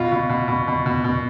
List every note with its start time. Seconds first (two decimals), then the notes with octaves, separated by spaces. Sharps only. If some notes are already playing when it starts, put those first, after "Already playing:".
Already playing: B2 F4
0.12 B2
0.29 B2
0.48 B2
0.68 B2
0.86 B2
1.04 B2